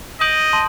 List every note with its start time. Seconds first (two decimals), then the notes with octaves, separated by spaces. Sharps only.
0.21 D#5 D#6 G6 D7 F#7
0.53 A5 C6